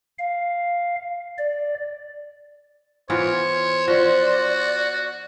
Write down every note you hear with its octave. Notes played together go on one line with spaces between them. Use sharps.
F5
D5
E3 B3 F4 C5 C#5
F3 F#4 D5